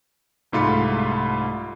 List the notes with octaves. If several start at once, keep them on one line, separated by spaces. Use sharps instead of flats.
C2 G#2 A3 F4 B5 C#7